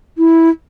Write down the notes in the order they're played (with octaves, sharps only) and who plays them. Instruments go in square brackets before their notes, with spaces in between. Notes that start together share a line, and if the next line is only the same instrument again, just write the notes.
[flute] E4